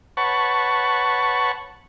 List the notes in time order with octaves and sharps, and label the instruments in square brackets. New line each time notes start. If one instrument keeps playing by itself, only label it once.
[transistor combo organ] B4 C#5 F#5 A5 C#6